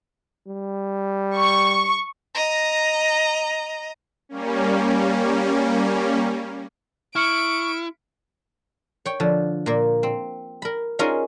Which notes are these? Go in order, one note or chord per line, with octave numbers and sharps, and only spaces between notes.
G3
C#6
D#5 A#5
G3 A#3 C#4
E4 C#6 F6 C#7 D7
C#5 G5
D3 F3
A#2 A#3
C4
A#4 B5
C#4 D#4 F4 G#4 A#4